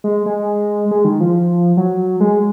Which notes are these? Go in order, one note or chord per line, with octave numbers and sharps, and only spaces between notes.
G#3
G#3
G#3
D#3
F3
F#3
G#3